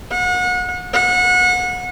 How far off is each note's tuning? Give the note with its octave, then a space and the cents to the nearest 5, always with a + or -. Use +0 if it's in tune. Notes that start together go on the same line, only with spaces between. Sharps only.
F#5 -35
F#5 -30